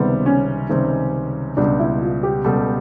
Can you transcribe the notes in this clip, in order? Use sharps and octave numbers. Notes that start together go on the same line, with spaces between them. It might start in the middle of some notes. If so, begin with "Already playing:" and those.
Already playing: C#2 C3 D#3 G3 B3 C4
C#4
C#2 C3 D#3 G3 C4
C#2 B2 G3 D4
E4
F4
G4
C#2 B2 G3 A4